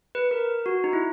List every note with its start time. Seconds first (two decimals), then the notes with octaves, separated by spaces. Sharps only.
0.15 B4
0.31 A#4
0.66 F#4
0.84 D#4
0.93 E4